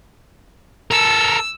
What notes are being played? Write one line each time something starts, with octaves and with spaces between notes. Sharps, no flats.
A4 A#4 E6